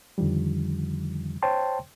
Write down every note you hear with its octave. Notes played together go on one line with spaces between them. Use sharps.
F2 D3 D#3 F3 G3
C5 C#5 G5 A5 C6